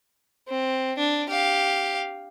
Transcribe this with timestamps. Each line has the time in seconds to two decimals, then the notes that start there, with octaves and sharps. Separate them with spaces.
0.48 C4
0.98 D4
1.29 G4 F5